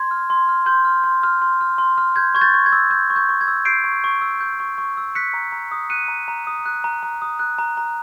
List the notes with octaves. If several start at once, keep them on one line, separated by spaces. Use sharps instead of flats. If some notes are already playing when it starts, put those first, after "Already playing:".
Already playing: C6 G#6
F6
C6
F6
C6 G6
F6
C6
F6
C6
F6
C6
F6
G6 G#6
C#6 G#6
G6 A6
C#6
G#6
E6
G6
C#6
G6
C#6
G#6
E6
G6 C7 D7
C#6
C#6
E6
G6
C#6
C#6
E6
F#6 B6 C#7
A#5
A#5
D#6
F#6 C#7 D#7
A#5
A#5
D#6
F#6
A#5
A#5
D#6
F#6
A#5
A#5